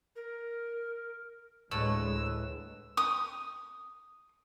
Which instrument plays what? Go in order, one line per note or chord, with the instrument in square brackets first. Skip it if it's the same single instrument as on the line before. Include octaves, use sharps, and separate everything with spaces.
[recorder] A#4
[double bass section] D2 G#3 [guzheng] A2 [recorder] B4 [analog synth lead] E6
[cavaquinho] D#6